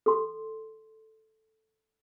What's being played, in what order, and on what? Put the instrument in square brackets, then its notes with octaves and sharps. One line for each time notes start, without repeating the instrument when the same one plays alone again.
[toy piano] A4 C6